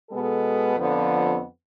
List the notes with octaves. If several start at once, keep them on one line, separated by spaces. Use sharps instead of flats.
B2 G#3 B3 A4
F2 D3 F3 B3